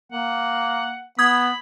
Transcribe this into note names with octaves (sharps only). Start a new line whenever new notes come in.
A#3 F#5
B3 B5 D#6 G#6